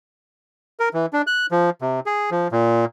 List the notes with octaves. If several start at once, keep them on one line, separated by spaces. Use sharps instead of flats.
A#4
E3
D4
F#6
F3
C3
G#4
F3
A#2